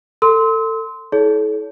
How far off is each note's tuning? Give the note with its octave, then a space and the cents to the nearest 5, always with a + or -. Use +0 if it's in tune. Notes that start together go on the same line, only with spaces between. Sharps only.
A4 +25 C6 -10 E6 -40
E4 -35 A4 -40 C#5 +30